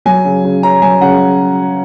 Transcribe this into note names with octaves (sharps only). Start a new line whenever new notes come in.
F#3 G#5
C#3
C#3
C#4 A#5
F#3 G#5
C#3 F#5